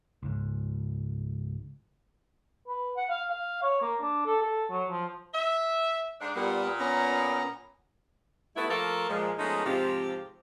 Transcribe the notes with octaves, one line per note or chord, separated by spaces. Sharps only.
C#2 G#2
B4
F#5
F5
F5
C#5
A#3
D4
A4
A4
F#3
F3
E5
G#2 D4
A#2 G3 B3
B3 C#4 A#5
G3 A3 B3 E4
F3 A3 A#3 A4 A#4
A#2 F3 G#3
F3 G#3 A3 B3 C#4 D#4
G#2 C3 F3 C4 F4 G4